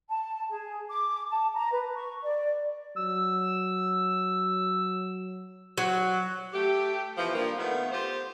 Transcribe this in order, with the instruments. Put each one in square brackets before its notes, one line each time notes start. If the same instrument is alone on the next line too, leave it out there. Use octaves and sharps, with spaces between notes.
[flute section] A5
G#4
D6
A5
A#5
B4
C#6
D5
[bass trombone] F#3 [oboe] E6
[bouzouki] F#3
[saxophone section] A3 G4
B2 E3 F3
A#2 F3 G3 A#3 D4
D#3 A3 B3
F4 G4 C5